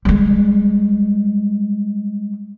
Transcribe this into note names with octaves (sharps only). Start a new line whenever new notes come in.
G3 G#3